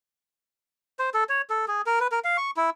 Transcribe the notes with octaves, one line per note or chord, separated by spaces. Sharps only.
C5
A4
C#5
A4
G#4
A#4
B4
A#4
F5
C#6
E4